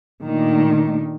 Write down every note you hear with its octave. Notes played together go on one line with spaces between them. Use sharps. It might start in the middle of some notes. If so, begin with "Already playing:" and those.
A#2 D#3 A3 D4